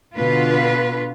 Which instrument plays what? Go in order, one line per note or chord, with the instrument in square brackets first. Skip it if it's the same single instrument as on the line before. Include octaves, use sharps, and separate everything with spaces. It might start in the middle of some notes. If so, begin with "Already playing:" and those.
[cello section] B2 D3 F4 B4